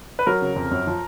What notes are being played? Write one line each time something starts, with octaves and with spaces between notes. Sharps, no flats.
B4
F#3 A#4
C#3
F2
F#2
F3